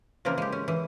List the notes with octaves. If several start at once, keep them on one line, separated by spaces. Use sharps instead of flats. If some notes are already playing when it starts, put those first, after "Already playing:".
C#3 E3 F3 A#3 C4 A#4
G#3 G4
C#4
E3